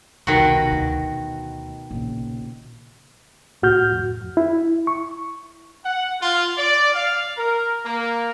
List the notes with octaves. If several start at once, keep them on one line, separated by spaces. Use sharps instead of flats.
E1 C2 B2 D#3 F#4
D2
A#1 C#3
C2 A2 F#4 F6 G6
F2
E4
C#6
F#5
F4
D5
F5
A#4
A#3